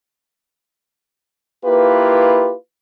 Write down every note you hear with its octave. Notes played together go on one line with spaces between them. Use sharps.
A#3 E4 F4 G4 B4